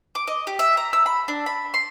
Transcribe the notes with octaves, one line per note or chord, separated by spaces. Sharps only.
D6
D#5
G4
E5
A#5
E6
B5
D4
B5
C6